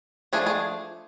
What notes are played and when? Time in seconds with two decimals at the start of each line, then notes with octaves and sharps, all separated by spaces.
0.33 F3 A3 D4 G#4
0.46 G#4